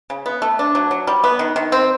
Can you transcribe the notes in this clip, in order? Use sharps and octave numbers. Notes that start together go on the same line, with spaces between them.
C#3
B3
A3
D4
F#3
F#3
G3
B3
D#3
D#3
C4